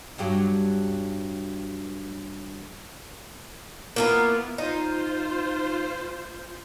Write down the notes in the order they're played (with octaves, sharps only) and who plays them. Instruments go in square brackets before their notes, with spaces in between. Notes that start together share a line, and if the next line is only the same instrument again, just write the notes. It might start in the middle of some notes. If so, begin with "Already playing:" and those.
[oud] G2 F#3 G4
[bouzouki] A#3 F4 A#4 [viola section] B3 E4
[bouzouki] D#4 [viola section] F4 C5